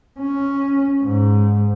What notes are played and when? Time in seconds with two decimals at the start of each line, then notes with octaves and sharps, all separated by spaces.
0.19 C#4
1.03 G#2